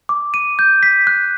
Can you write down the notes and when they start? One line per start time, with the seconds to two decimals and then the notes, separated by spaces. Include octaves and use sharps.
0.09 D6
0.34 D#7
0.59 G6
0.83 B6
1.07 F#6